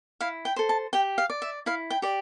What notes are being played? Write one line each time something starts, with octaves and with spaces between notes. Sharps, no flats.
E4 F5
G5
A4 C5
A5
G4 G5
F5
D5
E5
E4 F5
G5
G4 D5